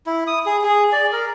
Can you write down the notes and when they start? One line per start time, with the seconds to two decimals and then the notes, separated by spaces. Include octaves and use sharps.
0.07 E4
0.27 D#6
0.46 G#4
0.64 G#4
0.92 D5
1.12 A#4